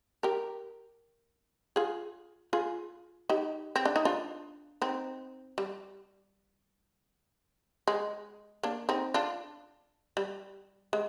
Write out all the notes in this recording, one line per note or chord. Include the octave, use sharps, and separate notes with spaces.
G4 A#4
F4 G#4
F4 G#4
D#4 G4
C4
D4
D#4
D4 F4
C4 D#4
G3
G#3
A#3 D4
C4 D#4
D4 F4
G3
G#3